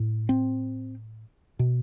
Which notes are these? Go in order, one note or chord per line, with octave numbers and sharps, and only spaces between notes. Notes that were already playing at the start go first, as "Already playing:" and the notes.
Already playing: A2
C4
B2